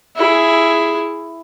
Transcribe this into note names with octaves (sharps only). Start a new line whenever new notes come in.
E4 G#4